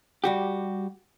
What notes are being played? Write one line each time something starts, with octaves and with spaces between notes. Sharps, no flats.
G3 F#4 G4